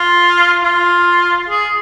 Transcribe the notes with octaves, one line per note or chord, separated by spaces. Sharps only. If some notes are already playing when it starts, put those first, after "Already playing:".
Already playing: F4
F4
G#4